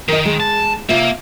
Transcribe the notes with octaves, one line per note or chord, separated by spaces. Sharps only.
D#3 A#4 D#5
G#3
A5
C3 A#3 F4 E5